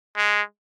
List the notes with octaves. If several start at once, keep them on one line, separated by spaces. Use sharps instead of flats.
G#3